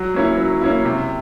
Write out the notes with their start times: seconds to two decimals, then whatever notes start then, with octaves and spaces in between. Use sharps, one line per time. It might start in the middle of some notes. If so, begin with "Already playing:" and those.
Already playing: F#3
0.14 A#3 C#4 E4
0.37 F#3
0.61 A#3 C#4 E4
0.85 C3